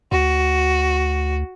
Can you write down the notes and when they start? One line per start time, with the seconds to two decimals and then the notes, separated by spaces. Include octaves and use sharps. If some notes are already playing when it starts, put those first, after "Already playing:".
0.12 D2 F#4